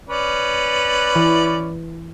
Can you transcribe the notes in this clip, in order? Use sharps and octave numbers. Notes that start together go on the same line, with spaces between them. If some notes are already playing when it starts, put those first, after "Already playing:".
C#4 B4 D5
E3